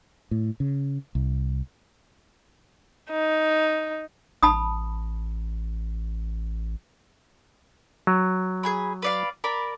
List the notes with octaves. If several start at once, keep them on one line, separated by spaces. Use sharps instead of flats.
A2
C#3
C2
D#4
A1 A5 B5 D#6
F#3
G#4 G#5 B5
B4 D5 F5
A#4 D5 B5